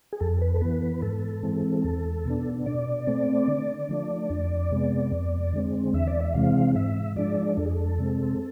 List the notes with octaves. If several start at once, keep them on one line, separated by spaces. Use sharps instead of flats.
G#4
F2 A4
B4
A4
E3 B3 B4
B4
G#2 A4
E3 G#3 C4
E2
B2 B3 D4
B2 D5
A3 C4
D3
F3 A3 D4
F2
C3 G#3 B3
F2
D3 G#3 C4
E2 E5
D5
E5
C3 E3 G#3 C4 F5
G#2 E5
F3 G#3 D4 D5
F2 A4
G#4
A4
C3 G#3 C4